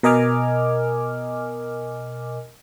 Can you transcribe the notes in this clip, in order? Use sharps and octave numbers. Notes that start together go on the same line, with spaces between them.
B2 A#4 D#5 G#5 D6 F6